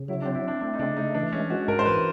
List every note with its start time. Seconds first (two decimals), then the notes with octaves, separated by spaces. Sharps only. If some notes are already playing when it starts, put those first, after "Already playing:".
Already playing: C#3
0.08 F#3 E4
0.22 C4 D4
0.35 E4
0.44 C4 D4
0.61 A3 D4
0.74 D#4
0.79 C#3 D4
0.96 A3 D#4
1.14 E3 D4
1.33 G#3 C#4
1.50 G#3 F#4
1.68 G#2 A#4
1.79 C5
1.86 E3 B4